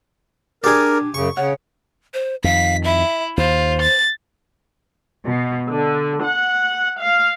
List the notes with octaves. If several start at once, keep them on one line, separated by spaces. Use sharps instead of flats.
D4 G4 G#4 A#4 D5 G#5
F#2 C#3 C#6
C#3 C#5 F#5
C5
F2 D#3 F5 B6
E4 E5
D#2 F4 C5
A6
B2
D3
F#5
F5